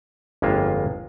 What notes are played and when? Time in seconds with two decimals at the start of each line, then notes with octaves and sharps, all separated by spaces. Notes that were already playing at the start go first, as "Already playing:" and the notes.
0.42 G1 F2 G#3 A#3 F4 E5